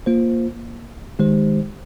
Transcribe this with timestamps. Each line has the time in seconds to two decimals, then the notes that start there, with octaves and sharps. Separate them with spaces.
0.06 A#3 F4 C5
1.19 D#3 G#3 D#4 G4 C5